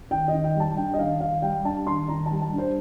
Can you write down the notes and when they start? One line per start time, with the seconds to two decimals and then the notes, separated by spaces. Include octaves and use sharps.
0.11 D#3 G5
0.28 D#3 D#5
0.44 G5
0.56 G3 A5
0.77 D4 G5
0.94 D#5
0.99 D#3 F5
1.21 D#3 F5
1.42 G3 G5
1.65 D4 A5
1.87 D#3 C6
2.08 D#3 A#5
2.26 A5
2.31 G3
2.42 A5
2.53 D4
2.58 C5